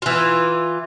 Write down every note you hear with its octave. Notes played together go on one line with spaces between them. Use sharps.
E3 F4